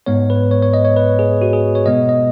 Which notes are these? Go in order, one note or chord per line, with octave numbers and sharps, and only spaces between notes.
G#2 G#3 B3 C#5
B4
C#5
C#5
D#5
C#5
B4
G#4
F#4
G#4
C#5
B2 G#3 B3 D#5
D#5